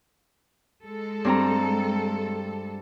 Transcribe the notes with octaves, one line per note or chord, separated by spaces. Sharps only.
G#3 A4
G2 C4 A#5